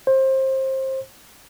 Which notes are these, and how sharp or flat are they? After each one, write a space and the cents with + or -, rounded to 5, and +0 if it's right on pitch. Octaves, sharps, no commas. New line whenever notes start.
C5 +25